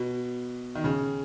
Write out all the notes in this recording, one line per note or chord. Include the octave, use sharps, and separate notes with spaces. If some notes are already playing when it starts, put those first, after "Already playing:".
Already playing: B2
D#3
C#3